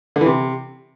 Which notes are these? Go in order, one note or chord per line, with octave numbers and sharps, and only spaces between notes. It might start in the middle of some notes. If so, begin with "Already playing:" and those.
D3
E3
C3